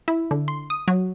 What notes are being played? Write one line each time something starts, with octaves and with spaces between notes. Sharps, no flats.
E4
D3
C6
D#6
F#3